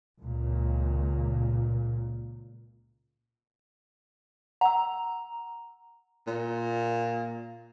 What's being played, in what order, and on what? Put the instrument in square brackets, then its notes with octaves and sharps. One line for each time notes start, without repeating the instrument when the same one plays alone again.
[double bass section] C#2 A#2
[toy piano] F#5 E6 [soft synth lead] A#5
[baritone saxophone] A#2